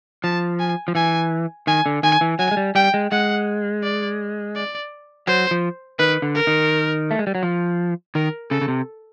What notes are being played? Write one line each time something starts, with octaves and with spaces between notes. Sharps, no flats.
F3 A5
G#5
F3
E3 G#5
D#3 G#5
D3
D#3 G#5
E3
F#3 G#5
G#3
G3
G3 G5
G#3
G#3 F#5
D5
D5
F#3 C5
F3
D#3 B4
D3
A#4
D#3
A3
G#3
G3
F#3
F3
D#3 A#4
C#3 A4
C#3
C3